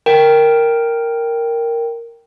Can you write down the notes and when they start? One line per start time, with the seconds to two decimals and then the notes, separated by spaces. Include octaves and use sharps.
0.06 A#4 G5